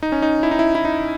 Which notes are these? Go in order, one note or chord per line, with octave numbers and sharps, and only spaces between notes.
D#4
C#4
D#4
E4
D#4
E4
E4
D#4